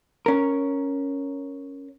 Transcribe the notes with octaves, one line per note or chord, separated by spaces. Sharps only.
C#4 A#4